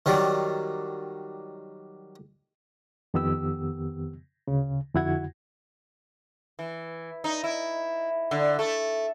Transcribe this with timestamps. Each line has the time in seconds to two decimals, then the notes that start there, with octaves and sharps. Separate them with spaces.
0.06 D#3 F#3 G3 D5
3.14 F2 D#3 B3 G4 E6
4.48 D2 C#3
4.95 F2 D3 E4 F#4 F#5 G#6
6.59 E3
7.24 D#4
7.44 E4
8.31 D3
8.59 A3